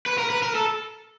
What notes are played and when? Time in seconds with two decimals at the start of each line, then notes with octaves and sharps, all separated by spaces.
0.06 B4
0.18 A#4
0.30 B4
0.43 A#4
0.55 A4